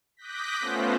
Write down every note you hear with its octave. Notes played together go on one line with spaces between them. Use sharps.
D6 D#6 F#6 G6 A#6 B6
A3 B3 C#4 F4 C5